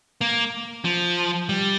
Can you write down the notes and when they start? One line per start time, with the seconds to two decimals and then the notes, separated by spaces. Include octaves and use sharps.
0.21 A#3
0.85 F3
1.49 G3